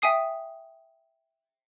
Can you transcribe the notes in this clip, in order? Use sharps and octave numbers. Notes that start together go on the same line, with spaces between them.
E5 G5 G#5 D#6 C7